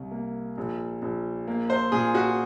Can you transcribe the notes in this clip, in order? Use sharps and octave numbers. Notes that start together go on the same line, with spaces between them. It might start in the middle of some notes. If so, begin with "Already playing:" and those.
Already playing: C2
A#3
A#1
A#1
A#3
C5
A#2 G#4
F#4